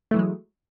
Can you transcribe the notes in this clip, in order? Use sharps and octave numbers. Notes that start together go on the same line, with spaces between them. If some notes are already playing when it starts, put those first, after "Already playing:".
E3 F#3 G#3 A3